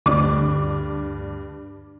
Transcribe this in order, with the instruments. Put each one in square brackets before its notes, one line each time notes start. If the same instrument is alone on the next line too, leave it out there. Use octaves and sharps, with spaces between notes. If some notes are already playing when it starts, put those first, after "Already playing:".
[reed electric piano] D2 [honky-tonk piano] G2 D4 D6